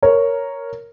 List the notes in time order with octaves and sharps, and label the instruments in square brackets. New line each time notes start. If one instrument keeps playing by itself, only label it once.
[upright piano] A#4 C#5